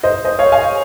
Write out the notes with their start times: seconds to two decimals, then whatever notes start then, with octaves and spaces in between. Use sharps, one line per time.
0.03 C5 D#5
0.25 C5 D#5
0.39 C#5 F5
0.52 F5 G#5